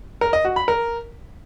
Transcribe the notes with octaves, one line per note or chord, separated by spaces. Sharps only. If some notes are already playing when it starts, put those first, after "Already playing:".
A#4
D#5
F#4
B5
A#4